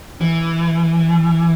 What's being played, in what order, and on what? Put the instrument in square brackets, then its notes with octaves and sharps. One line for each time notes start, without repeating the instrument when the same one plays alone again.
[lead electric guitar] E3